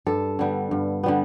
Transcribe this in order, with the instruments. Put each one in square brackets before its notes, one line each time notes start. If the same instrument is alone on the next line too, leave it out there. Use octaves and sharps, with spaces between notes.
[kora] G2 A4
D3 G3 B3
G2
D3 G3 B3